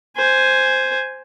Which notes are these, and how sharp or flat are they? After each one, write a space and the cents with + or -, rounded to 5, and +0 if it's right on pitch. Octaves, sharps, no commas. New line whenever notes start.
C5 +0 G#5 +0